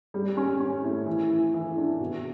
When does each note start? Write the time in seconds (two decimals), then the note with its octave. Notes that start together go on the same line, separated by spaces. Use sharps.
0.14 G3
0.37 C#4
0.60 C#4
0.84 A2
1.06 E3
1.30 E3
1.54 E3
1.77 D4
2.00 B2